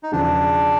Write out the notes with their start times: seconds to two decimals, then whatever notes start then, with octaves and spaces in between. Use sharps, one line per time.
0.03 D#4
0.12 E1 E2 C#3 F3 D4